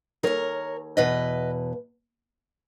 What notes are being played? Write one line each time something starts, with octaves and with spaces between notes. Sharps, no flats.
D#2 D#3 A#4 C#5
E2 B2 B4 D#5